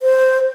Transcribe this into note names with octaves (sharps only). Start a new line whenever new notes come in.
C5